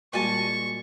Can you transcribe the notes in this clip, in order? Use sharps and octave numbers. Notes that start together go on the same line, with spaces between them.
A#2 G3 G#3 F#4 G#5 A5 C#6